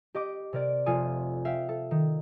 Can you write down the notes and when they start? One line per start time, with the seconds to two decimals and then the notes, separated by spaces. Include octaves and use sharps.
0.15 G4 D#5 D6
0.53 C3 A#4 D5
0.86 F1 F4 A4 G#5 D#6
1.45 E5 F5 G5
1.69 A4
1.91 D#3